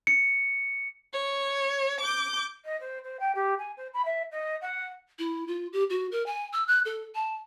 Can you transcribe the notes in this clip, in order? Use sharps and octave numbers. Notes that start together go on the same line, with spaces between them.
C#7
C#5
D6 G6
D#5
C5
C5
G5
G4
G#5
C5
B5
E5
D#5
F#5
E4
F4
G4
F#4
A#4
G#5
E6
F#6
A4
A5